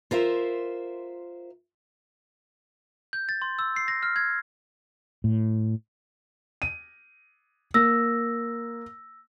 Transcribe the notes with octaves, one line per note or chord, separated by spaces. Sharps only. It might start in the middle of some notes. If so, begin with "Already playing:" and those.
F4 A#4 C5 E5
G6
A6
C6
E6
C7
A#6
F6
G#6
A2
D#7
A#3 E6 A#6